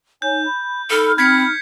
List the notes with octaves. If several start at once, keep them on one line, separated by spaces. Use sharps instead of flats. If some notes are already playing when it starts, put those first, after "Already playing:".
D#4 C#5 G#5 G6
B5
D#4 A4 B5 F6
C4 G#6 B6 C#7